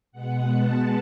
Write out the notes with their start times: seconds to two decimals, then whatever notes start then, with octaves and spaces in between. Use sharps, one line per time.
0.12 B2 G#3 B3 F#5
0.51 A5